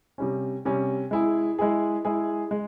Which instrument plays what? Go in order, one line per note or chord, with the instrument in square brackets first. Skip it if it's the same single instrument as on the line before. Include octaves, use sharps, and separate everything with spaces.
[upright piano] C3 G3 C#4
C3 G3 C#4
G#3 E4 G#4
G#3 E4 G#4
G#3 E4 G#4
G#3